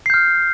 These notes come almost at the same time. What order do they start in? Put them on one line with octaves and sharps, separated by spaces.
C7 G6 F6